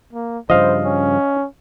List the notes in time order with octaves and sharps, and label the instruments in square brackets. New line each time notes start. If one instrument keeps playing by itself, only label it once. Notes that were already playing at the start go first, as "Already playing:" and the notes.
[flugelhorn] A#3
[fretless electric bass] G2 C#3 F3 [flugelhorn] C5 [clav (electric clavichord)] D#5 F5
[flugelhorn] C#4